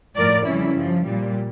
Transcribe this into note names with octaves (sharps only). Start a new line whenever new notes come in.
A2 F3 A#4 D5
F2 C#3 E3 G3 C#4 E4
G2 F3
A#2 G3